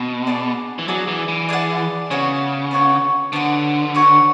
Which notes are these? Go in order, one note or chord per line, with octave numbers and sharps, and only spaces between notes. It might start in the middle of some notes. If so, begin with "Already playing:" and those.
Already playing: B2
D4 G#4 D5 F#5
E3
F#3 D4 G#4 D5 F#5
E3
E3
D4 G#4 D5 F#5
C#3 B3 F#4 C#5 F#5
B3 F#4 C#5 F#5
D3 B3 F#4 C#5 F#5
B3 F#4 C#5 F#5